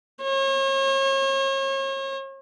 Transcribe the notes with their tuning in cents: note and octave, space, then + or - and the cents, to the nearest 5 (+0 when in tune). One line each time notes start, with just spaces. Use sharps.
C#5 -40